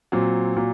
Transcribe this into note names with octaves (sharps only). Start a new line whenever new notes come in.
A#2 F#3 C4
A#2 F#3